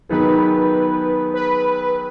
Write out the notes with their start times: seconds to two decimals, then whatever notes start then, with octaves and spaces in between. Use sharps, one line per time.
0.09 D#3 F#3 B3 D#4 G#4 B4
1.34 B4